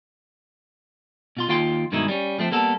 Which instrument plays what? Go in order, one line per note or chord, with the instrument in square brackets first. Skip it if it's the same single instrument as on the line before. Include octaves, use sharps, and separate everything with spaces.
[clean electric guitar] B2 F4 C6
D#2 F4 F5 G5 C6
G2 B2 D#3 G#3 D#4 E4
G3 C#4
F3 A3 C4
G3 A#3 B3 A4